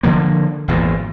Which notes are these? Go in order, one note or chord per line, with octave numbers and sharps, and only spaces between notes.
D3 F3 A#3
G#1 E2 A#2